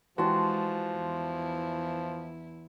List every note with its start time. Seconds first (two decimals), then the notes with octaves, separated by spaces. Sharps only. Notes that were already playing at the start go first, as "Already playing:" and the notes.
0.18 E3 F3 G#3 F#4 A5 C6
0.98 E2 E4